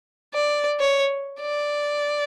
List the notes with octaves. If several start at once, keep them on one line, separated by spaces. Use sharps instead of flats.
D5
C#5
D5